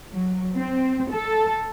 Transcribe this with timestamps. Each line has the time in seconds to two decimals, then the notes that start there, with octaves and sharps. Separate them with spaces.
0.12 F#3
0.54 C4
1.11 A4